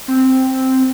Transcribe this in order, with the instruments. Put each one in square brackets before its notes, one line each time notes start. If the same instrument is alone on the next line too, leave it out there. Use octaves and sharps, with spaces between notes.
[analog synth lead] C4